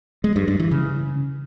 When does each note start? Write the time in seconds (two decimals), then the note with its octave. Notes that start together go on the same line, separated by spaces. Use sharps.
0.24 G#3
0.36 G2
0.48 G2
0.60 E3
0.71 C#3